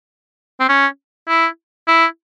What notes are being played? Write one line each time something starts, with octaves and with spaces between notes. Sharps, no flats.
C4
C#4
E4
E4